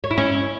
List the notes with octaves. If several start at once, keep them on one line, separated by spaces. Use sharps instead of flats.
C#5
E4
C#4